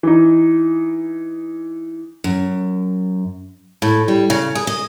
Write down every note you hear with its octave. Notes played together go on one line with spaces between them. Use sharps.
E3 D#4
F#2
A2
G3
C#3
G#4
D#5